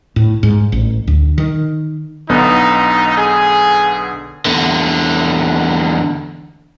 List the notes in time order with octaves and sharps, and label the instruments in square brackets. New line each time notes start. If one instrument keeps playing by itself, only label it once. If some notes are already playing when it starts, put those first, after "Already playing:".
[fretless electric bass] A2
G#2
A1
D2
D#3
[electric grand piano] B1 D3 B3 [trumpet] D#4
[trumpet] G#4
[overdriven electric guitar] E2 D3